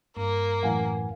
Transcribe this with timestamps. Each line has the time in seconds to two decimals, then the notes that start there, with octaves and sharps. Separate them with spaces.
0.17 G2 A#3
0.63 F#2 A2 E3 F5 F#5 G#5